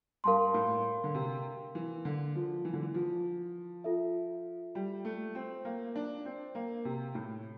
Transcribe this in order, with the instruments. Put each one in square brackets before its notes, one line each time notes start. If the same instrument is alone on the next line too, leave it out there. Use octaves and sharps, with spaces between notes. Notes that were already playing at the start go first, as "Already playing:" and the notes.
[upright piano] G2 [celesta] A#4 F5 A5 C6
[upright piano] A2
D3
C3
E3
D3
F3
E3
D3
E3
F3
[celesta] F4 A4 E5
[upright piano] G3
A3
C4
A#3
D4
C4
A#3
C3
A2